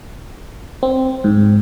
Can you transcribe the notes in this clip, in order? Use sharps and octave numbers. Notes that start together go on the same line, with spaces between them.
C4
G#2